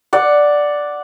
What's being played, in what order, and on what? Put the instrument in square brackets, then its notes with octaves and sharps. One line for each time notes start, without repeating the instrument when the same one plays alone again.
[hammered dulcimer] D5 F#5